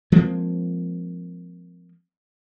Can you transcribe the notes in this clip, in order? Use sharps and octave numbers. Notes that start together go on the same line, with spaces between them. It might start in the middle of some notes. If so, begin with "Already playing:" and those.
F3 G#3 A#3 C4